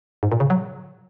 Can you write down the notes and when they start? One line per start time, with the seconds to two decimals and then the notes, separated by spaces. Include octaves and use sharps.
0.23 G#2
0.32 A#2
0.40 C#3
0.50 F#3